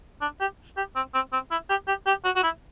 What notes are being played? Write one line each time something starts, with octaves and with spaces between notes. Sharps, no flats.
D4
G4
G4
C4
C4
C4
E4
G4
G4
G4
F#4
F#4
E4